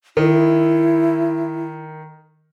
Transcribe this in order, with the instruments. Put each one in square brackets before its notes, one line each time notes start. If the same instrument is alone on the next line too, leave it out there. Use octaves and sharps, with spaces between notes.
[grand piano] D#3 [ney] E4